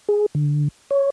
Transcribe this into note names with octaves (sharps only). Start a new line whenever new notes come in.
G#4
D3
C#5